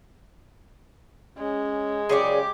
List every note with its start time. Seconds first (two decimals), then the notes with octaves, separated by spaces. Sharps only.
1.38 G#3 C#4
2.09 C#2 F#2 C#3 G4 G#4 C#5 D5 D6